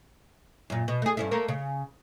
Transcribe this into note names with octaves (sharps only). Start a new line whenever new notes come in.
F#2 A#2
B2
A3 G#4
G2 C#4 E4
A3 A#3 A#4
C#3